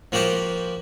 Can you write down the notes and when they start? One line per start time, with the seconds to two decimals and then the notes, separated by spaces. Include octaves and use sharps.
0.12 F3 A#3 F#4 G4 C5